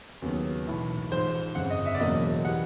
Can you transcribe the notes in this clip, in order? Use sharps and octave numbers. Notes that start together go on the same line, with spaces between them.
D#2 C#3 F#3 B3
B1 A2 E3 A3
A1 G#2 F3 G#3 C5
G1 F2 C#3 F#5
D#5
E5
D5
E1 E2 C#3 F#3 A#3 D#5
E3 G3 F#5